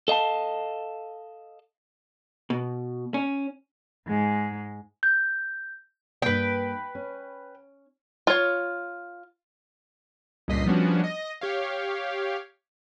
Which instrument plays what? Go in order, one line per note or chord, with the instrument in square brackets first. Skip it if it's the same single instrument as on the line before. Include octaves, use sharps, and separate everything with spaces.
[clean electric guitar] A4 D#5 F5 A5
[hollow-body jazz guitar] B2
C#4
[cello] G#2 G#3
[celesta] G6
[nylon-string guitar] G2 A#3 [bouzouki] B4 G5
[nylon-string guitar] C#4
[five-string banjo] F4 C#5
[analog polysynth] C#2 G2 A#2 D#5 B6 C7
F3 G3 B3 C#4 D4 F#4
D#5 A#6
G4 C#5 F5